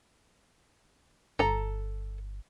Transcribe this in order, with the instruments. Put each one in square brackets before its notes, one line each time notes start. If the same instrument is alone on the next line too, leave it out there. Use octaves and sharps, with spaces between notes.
[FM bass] G1 [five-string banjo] A4 A#5